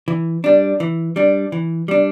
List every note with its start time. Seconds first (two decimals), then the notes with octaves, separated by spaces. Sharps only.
0.08 E3
0.44 G3 D4
0.80 E3
1.16 G3 D4
1.52 E3
1.88 G3 D4